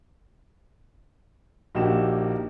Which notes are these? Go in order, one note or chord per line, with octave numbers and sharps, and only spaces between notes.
A#1 A#3 D#4 F#4 G4 E7